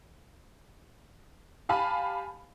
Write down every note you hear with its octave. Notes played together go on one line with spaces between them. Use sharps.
G4 F5 G#5 A5 B5